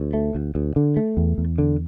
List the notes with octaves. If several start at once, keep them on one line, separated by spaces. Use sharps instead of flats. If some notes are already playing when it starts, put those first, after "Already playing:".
Already playing: D2
A3
D2
D2
D3
A3
E2
E2
D3